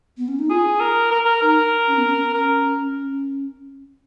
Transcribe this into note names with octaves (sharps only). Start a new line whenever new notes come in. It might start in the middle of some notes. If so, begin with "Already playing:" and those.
B3
C#4
D#4
F4 G#4
A#4
A#4
A#4
D#4 A#4
C#4
B3
C#4
C#4 A#4